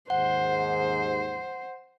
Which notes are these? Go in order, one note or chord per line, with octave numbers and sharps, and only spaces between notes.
D#2 G#2 C5 F#5